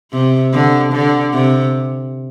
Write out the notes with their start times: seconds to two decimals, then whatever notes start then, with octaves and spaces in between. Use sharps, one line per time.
0.12 C3
0.53 D3
0.93 D3
1.33 C3